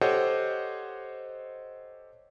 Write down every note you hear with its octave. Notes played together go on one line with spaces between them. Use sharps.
G4 A4 C5 C#5 D#5 F#5